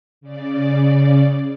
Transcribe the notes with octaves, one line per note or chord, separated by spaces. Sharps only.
C#3 D5